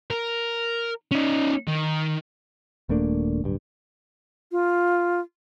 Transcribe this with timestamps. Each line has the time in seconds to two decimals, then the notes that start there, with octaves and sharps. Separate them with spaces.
0.11 A#4
1.11 C#4 D#4
1.68 D#3
2.89 D#1 A3 A#3 D4
3.44 D1 G2
4.52 F4